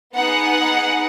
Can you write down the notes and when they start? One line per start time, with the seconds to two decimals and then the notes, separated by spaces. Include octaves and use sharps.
0.14 B3 D#4 G#4 F#5